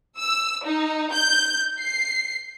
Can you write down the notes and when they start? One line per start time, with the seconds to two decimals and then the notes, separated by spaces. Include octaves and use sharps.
0.19 E6
0.64 D#4
1.12 G6
1.81 C7